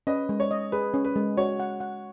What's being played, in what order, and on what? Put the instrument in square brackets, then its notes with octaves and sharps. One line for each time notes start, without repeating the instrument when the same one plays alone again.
[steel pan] C#4 [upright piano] B4 D#5
[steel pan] G#3
[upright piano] C#5
[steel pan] D#5
[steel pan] G#4 [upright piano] B4
[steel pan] C#4
[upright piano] B4
[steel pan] G#3
[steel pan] F#4 [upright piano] C#5
[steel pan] F#5
F#5